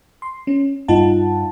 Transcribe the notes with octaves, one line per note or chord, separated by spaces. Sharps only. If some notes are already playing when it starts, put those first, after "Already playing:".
C6
C#4
G2 D#4 F4 F#5 A5